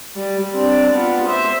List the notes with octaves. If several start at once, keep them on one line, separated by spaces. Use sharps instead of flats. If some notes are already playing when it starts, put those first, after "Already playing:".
G3
C4 D4
B3 F4
C5 E5